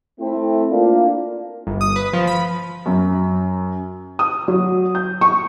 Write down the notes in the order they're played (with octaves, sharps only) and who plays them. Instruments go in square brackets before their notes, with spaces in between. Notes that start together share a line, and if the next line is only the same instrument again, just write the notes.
[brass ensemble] A3 C4 E4
A#3 D4 F4
[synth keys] G1
D#6
B4
F3
B5
[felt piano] F#2
D#6
F#3
G6
C#6